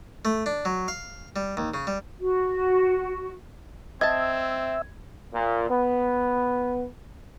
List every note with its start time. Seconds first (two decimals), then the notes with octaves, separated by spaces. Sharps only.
0.25 A3
0.46 D4
0.65 F#3
0.88 F5
1.36 G3
1.57 D#2
1.74 C#3
1.87 G3
2.20 F#4
4.01 C4 D#5 E5 A5 G#6
5.34 A#2
5.69 B3